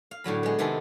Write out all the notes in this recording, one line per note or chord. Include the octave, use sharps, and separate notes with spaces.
F5
A2 D3 F#3 B5
G#3 B3
C3 D#3 B3 G#4 A4